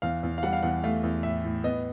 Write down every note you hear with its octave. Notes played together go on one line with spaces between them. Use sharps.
E2 F5
E2
F5
G3 F#5
F5
E2 F#5
A3 F5
E2
A2 E5
A2
B3 D#5